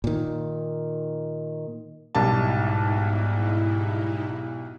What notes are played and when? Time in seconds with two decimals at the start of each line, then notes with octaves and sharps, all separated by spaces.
0.04 A#2 D#3
2.15 B1 G#2 G3 D#4 E4 A5